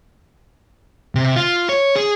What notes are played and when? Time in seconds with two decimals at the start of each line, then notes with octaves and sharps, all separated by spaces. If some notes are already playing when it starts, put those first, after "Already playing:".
1.15 C3
1.36 F4
1.69 C#5
1.96 G#4